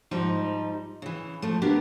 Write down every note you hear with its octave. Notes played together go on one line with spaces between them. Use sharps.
G#2 F3 G3 D#4
C#3 E3
F3 A3
A#3 B3 D4 G4 A#4